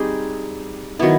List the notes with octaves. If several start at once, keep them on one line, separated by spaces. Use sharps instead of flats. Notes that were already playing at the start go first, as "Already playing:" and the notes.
Already playing: G3 C4 D#4 G#4
D#3 F#3 B3 E4